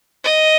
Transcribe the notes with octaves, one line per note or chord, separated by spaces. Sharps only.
D#5